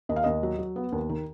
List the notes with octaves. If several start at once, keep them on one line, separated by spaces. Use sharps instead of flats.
D#2 D#5
F5
D#2 D#5
F#3
F#3
B3
D#2
D#3